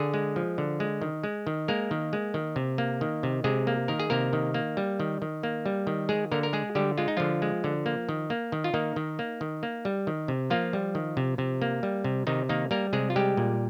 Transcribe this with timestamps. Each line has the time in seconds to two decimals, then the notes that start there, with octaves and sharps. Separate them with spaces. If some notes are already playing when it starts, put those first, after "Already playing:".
Already playing: D3 G#4
0.14 G#3
0.36 F3
0.58 D3
0.80 G#3
1.01 D#3
1.24 G#3
1.47 D#3
1.68 G#3 A#3 A#4
1.91 D#3
2.13 G#3
2.34 D#3
2.56 C3
2.78 A#3
3.01 D#3
3.23 C3
3.44 C3 G#3 G#4
3.67 A#3
3.88 D#3 A#4
4.00 G#4
4.10 C3 A#3 A#4
4.33 D#3
4.54 A#3
4.77 G3
5.00 D#3
5.22 D#3
5.43 A#3
5.66 G3
5.87 D#3
6.09 G#3 G#4
6.32 D3 A#3 A#4
6.43 A#4
6.53 G#3 G#4
6.75 D3 G3 G4
6.98 G#3 F4
7.08 D#4
7.17 D3 F3 F4
7.42 G#3
7.64 D3
7.86 A#3
8.09 D#3
8.30 A#3
8.52 D#3
8.64 F4
8.74 D#3 A#3 D#4
8.96 D#3
9.19 A#3
9.41 D#3
9.63 A#3
9.85 G3
10.07 D#3
10.28 C3
10.50 F3 A#3 F4
10.73 G3
10.95 D#3
11.17 C3
11.38 C3
11.62 A#3
11.83 G3
12.04 C3
12.27 C3 D#3 D#4
12.49 D#3 A#3 D#4
12.71 G3 A#3 A#4
12.93 C3 G#3 G#4
13.10 F4
13.16 G3 G#3 G4
13.37 A#2